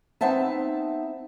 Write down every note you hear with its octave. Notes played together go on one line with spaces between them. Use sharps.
B3 C4 D#4 E5 A5